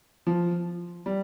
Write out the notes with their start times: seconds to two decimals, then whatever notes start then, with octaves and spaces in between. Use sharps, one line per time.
0.27 F3
1.06 G3